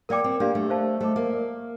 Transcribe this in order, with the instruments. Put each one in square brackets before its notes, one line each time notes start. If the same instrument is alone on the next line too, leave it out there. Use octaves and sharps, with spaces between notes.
[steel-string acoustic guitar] A#3 [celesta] A#4 D5 G5 D6
[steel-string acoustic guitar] C4
[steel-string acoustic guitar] A#3 [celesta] D4 G4 D5 F5
[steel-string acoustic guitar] A3
[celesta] C5 F5 A5
[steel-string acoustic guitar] A3 [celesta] C5 D#5 A5 D6
[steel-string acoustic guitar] A#3
[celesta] A#4 D5 F5